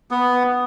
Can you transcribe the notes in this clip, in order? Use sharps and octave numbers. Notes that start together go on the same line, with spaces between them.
B3